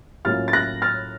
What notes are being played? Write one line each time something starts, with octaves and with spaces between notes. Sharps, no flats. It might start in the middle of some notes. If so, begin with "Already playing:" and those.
A2 F#3 A#3 C#4 F4 F6 A6
A6
F#6 A#6
F6 A6